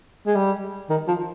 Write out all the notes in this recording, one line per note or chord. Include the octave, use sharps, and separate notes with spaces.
G#3
G3
D#3
F3